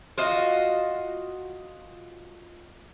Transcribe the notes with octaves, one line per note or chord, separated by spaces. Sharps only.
F4 F#4 D#5 F5